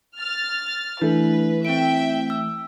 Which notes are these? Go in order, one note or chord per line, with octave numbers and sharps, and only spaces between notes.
F6 A6
E3 A3 D4 E4 B4
C4 E5 G5 D7
E6